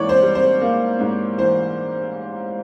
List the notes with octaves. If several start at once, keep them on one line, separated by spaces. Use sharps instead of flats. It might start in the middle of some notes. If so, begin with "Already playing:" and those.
Already playing: G#2 E3 A#3 C#5 D5
C5
G3
C5
A#3
G#2
E3 C5